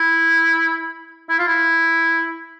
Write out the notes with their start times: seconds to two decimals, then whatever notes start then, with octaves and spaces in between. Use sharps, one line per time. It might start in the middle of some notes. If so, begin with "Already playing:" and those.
Already playing: E4
1.30 E4
1.39 F4
1.48 E4